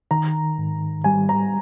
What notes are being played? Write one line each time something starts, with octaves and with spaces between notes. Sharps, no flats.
D#3 A#5
G#2
G3 G#5
A#5